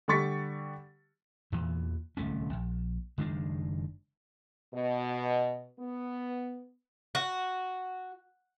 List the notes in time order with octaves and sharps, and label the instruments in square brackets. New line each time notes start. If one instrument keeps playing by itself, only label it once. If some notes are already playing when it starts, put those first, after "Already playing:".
[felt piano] D3 G3 G4 C#6 A6 B6
[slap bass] E2 A#2 E3
D1 C2 A3 C#4
A#1
F#1 D#3 G#3 D4
[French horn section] B2
B3
[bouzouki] F#4